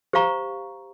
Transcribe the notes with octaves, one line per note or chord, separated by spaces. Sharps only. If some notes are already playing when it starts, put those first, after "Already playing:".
G4 C5 F5 A#5 C#6